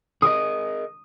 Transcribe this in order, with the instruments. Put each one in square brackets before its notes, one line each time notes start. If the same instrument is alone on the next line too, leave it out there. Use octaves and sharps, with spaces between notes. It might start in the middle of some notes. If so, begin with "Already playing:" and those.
[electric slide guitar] G#4 A#4 D#5 [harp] D#6